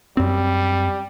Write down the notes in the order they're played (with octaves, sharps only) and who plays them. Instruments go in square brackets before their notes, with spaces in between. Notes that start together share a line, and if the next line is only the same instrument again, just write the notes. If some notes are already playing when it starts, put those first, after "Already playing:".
[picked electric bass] F#2 C4 [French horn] G3